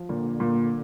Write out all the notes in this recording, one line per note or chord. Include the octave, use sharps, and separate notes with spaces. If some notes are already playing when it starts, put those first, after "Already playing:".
Already playing: F3
A#2 D3
A#2